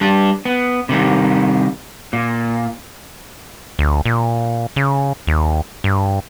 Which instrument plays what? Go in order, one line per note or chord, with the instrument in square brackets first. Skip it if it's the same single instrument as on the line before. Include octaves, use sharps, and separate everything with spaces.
[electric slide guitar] G3 D4
B3
C3 D#3 G3
A#2
[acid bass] D2
A#2
C#3
D#2
G2